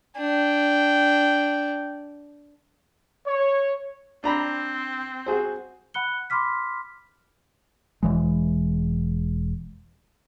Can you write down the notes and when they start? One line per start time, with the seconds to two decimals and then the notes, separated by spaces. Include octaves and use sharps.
0.17 D4 G5
3.26 C#5
4.24 C4 D4 A#5 B5
5.26 F#4 G#4 C5
5.94 F#5 B5 F#6 C#7 G7
6.30 B5 C6 D6 F6 B6
8.03 E1 E3 G#3